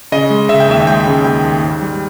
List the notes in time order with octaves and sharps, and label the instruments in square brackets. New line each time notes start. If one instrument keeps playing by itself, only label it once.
[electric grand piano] C#3 D#5
G#3
C#3 E5
G5
D#2 E5
E5
G#3 G5
C#3
D#2 G5
D#2
G#2
G3